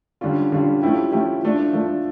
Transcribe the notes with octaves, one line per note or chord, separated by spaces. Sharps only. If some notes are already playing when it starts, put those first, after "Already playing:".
D3 G3 C#4 F4
D3 G3 C#4 F4
F3 A3 C#4 E4 G4
F3 A3 C#4 E4 G4
F3 A3 D4
F3 A3 D4